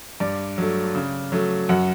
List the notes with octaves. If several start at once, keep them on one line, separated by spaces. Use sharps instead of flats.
G2 D5
F#3 A3
C#3
F#3 A3
F#2 F#5